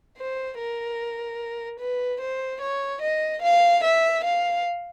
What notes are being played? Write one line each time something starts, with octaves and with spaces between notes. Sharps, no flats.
C5
A#4
B4
C5
C#5
D#5
F5
E5
F5